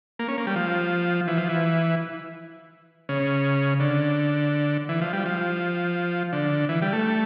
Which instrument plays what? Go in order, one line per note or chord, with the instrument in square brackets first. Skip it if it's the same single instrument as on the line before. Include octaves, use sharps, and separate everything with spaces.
[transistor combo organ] A#3
C#4
A#3
G3
F3
E3
F3
E3
C#3
D3
E3
F3
G3
F3
D3
E3
G3
A3